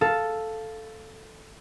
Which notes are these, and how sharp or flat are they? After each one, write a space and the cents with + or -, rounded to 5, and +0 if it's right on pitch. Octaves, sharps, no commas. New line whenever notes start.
A4 +0 F5 +0